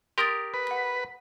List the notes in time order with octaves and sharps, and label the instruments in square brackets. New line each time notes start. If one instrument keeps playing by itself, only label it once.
[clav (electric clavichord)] G4 A#4 [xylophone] C6 D#6 A6
[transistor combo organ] B4
[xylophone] F#5 B6